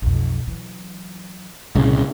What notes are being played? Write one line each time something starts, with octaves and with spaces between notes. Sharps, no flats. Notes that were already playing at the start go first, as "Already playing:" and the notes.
B1 F2
E3 F#3
C2 A#2 C#3